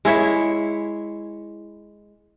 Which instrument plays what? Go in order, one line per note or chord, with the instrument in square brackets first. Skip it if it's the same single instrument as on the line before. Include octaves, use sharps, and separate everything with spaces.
[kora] G#3 E4 C#5 E5